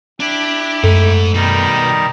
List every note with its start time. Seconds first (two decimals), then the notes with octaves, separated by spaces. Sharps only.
0.20 D4 E4 G4
0.84 F#2 G#3 A3 D#4 A4
1.34 B2 D#3 G3 D#4